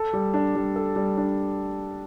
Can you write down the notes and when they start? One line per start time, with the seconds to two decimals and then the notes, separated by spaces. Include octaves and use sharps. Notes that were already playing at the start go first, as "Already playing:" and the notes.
Already playing: A4
0.13 G3
0.34 D4
0.55 G3
0.76 A4
0.96 G3
1.17 D4